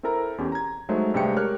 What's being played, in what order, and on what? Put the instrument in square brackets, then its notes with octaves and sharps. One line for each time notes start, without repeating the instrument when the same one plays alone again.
[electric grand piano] C4 E4 A4 A#4 A#5
E2 C#4 G4
A#5 G#6
F#3 G#3 A3 D#4 C5 C#5
G2 C3 G#3 A3 G5 C#7
G4 A#4 C#5 F6 F#6